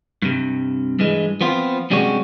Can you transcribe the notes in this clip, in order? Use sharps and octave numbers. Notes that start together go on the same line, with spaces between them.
G2 C3
G2 E3 G#3
F3 B3 C4 F4
G2 C3 G3 G#3 C#4 F#4